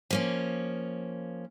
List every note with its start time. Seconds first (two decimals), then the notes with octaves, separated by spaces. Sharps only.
0.11 F3 A#3 C#4